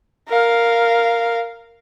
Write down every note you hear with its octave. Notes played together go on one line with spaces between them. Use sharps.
A#4 F5